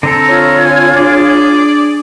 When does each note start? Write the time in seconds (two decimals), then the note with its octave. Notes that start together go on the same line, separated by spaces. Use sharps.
0.03 D3 C4 A4 A#5
0.27 F4 C#5
0.65 G#5
0.96 D4 G#4 D5